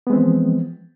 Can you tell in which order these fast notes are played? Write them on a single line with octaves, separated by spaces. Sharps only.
B3 G#3 C4 E3 F3